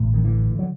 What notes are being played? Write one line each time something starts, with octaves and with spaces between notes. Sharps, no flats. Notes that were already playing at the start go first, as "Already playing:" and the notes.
Already playing: A1 A2
D#3
D3 E3
F#3